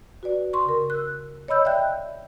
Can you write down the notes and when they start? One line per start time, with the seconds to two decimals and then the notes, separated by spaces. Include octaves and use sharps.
0.23 F#4 B4 D5
0.53 C6 C#6
0.65 C#3 A#4
0.90 E6 F#6
1.48 C#5 D#5 B5 E6 G6
1.65 D5 E5 G5 F#6 G6